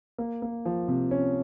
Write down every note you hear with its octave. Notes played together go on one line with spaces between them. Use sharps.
A#3
A#3
F3
C3
C#4